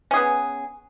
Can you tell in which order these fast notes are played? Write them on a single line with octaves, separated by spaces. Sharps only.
C#4 G#4 B3